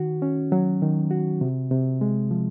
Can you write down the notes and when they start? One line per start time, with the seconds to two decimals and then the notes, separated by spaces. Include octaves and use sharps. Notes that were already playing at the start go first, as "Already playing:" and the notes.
Already playing: D#3 F#4
0.22 C#4
0.52 F#3
0.82 D#3
1.11 F#4
1.41 C3
1.71 C3
2.01 G#3
2.31 F3